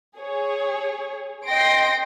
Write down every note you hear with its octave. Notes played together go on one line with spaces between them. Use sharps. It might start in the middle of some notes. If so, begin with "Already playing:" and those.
G#4 C#5
D#5 G5 C6 A#6 D7